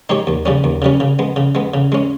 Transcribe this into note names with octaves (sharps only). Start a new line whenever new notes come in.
G#3 D#4 G4 C#5
D#2
C#3 G3 C#4
D#2
C#3 G3 C#4
C#3
G#3 B3
C#3
G#3 B3
C#3
G#3 C#4